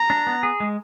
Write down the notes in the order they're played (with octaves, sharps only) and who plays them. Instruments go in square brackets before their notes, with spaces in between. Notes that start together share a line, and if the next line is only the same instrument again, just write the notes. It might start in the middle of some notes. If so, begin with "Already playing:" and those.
Already playing: [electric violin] A#5
[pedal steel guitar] D4
B3
G#4
G#3